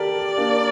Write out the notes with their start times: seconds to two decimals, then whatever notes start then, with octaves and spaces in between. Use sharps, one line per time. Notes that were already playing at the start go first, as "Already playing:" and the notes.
Already playing: G4 A4 A#4 D5
0.38 A#3 D4